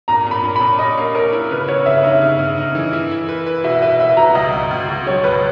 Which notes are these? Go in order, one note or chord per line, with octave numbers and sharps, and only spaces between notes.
A#2 A#5
A#2 B5
A#2
B5
A#2
C#4 D#5
A#3
C#4 A#4
E4
C#3 B4
B3 C#5
C#3 E5
D#4 E5
C#3
C#3
D#4
E3
E4
E4
B4
B4
B2 E5
B4 E5
B4 E5
B2 A#5
C#2 D#5
C#2
C#2
B2
F#3 C#5
C#2 B4